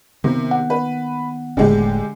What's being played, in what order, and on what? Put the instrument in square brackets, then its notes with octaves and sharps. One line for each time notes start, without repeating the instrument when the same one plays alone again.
[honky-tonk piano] C3 [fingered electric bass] D#3 A#3 B3
[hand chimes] F#5
[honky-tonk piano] B4
[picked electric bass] F1 A2 [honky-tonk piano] D3 G#3 G4